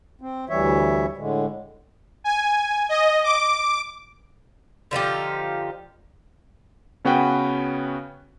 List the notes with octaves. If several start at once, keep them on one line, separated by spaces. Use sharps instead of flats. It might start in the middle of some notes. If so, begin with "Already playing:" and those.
C4
D2 E3 G3 C#5 E5
A2 D3 G#3
G#5
D#5
D6
D3 F3 D#4 G4
C#3 B3 C#4 F#4 B4 G5